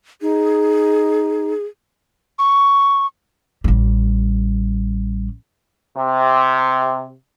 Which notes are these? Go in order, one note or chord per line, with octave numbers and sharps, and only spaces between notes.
D#4 G#4
C#6
A1 G3
C3